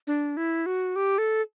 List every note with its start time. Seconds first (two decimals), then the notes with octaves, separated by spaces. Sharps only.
0.07 D4
0.37 E4
0.66 F#4
0.96 G4
1.18 A4